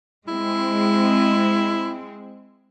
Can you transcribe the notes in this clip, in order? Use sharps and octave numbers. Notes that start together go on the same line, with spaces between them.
G#3 C4 E4